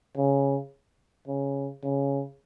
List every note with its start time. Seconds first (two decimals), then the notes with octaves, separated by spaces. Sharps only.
0.17 C#3
1.28 C#3
1.83 C#3